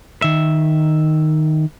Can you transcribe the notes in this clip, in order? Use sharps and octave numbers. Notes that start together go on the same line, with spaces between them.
D#3 E5